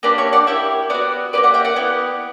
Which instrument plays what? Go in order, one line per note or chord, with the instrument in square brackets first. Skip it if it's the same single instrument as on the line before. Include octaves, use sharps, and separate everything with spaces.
[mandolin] A#3 D4 G4 B4 D5
C#5 E5
D5 F#5
A#3 E4 G4 E5 G5
B3 F#4 D5 F#5
A#3 E4 G4 B4 D5
D5 F#5
E5 G5
D5 F#5
B3 E4 G4